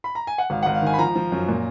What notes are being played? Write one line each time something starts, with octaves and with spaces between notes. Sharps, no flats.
B5
A#5
G#5
F#5
G#1 F5
G#1 F#5
F5
D#3 G#5
B5
F3 A#5
F3
F#2
A#2